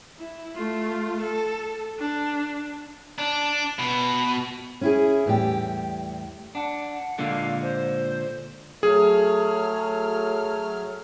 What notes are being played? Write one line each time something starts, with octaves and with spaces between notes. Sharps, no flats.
E4
A3 F4
A4
D4
D4
B2
C#4 E4 G#4
E2 A2 G3 G4
D4 F#5
A#2 D3 G#3 F5
C5
F#3 A3 G#4 F6